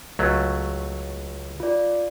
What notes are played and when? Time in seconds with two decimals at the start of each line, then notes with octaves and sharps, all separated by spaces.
0.19 C#2 F#3 A3
1.60 F4 D5